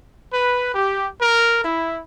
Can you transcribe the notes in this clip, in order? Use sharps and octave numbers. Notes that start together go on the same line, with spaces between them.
B4
G4
A#4
E4